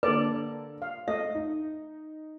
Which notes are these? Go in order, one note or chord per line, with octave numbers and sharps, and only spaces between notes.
D3 A#3 A4 B4 D5
F5
A3 D#5 E5
D#4